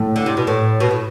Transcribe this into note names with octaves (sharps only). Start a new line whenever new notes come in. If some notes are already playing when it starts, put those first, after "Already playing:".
Already playing: A2
D3
C3
B2
A2
B2
A2